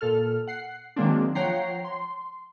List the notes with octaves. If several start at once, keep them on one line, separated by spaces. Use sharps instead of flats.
A#2 A4 F6
F#5 C7
D#3 F#3 G#3 A#3 C4 D4
F3 C#5 F#5 G5 A#5 C7
C6